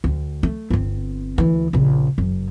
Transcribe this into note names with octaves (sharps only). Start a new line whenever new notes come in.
D2
A3
G1 C4
D2 E3
A#1 C#3
F#1 F#2